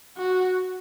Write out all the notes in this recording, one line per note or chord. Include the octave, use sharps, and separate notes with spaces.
F#4